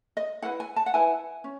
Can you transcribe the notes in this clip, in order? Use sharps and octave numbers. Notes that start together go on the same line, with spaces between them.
D#5
E4 B4 F#5
G#5
A5
F#5
E4 B4 G#5
C#4